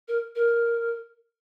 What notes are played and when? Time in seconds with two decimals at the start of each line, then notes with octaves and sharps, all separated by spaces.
0.08 A#4
0.35 A#4